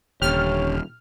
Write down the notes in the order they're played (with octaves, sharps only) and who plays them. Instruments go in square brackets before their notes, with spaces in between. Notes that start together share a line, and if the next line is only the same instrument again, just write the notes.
[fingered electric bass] D#1 [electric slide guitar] D3 C#4 G4 [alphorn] C#5 [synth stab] F6